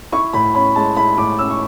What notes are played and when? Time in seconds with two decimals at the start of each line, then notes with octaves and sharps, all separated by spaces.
0.12 E4 C#6
0.33 A2 B5
0.55 C#4 B5
0.75 G#3 A5
0.96 E4 B5
1.18 A2 D6
1.39 C#4 E6
1.50 C#6